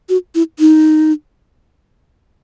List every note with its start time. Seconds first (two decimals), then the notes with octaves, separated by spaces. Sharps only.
0.09 F#4
0.35 E4
0.59 D#4